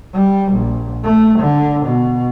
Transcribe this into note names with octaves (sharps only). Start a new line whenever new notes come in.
G3
A#1
A3
D3
B2